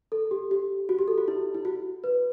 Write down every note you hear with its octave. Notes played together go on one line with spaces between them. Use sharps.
A4
G4
G4
F#4
G4
A4
F#4
E4
E4
F#4
B4